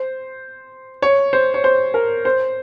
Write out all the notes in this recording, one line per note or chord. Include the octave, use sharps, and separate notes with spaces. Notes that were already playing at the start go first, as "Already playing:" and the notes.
Already playing: C5
C#5
C5
C#5
C5
A#4
C5